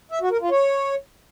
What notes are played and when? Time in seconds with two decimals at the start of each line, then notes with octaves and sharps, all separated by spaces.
0.12 E5
0.21 F#4
0.31 A#4
0.41 F4
0.51 C#5